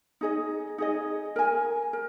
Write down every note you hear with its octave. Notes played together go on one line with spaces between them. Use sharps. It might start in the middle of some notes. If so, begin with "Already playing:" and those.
D#4 G#4 D#5
D#4 G#4 D#5
A#4 G#5
A#4